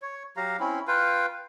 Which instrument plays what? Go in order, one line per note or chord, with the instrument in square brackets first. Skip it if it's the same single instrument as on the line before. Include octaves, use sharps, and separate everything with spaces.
[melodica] C#5
F#3 G4 F5 A#5
C4 C#4 E4
F4 B4 F5 G5